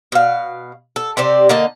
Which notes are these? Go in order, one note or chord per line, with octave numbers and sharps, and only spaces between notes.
B2 F5
A4
C3 G4 C5 D5
D3 A#3 D#5 A5